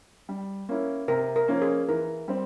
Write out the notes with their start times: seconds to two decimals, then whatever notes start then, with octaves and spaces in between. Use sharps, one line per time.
0.29 G3
0.69 A#3 C#4 E4
1.08 C3 A#4
1.36 A#4
1.48 F3 A#3 C#4
1.62 G#4
1.89 E3 A#4
2.28 G3 C4